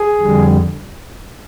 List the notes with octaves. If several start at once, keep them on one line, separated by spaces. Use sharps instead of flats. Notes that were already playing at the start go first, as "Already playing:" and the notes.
Already playing: G#4
F2 D3 G3